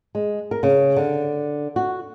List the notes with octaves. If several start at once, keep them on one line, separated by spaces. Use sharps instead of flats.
G#3
A#4
C#3
D3
F#4